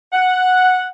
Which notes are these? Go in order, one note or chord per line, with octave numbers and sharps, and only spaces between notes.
F#5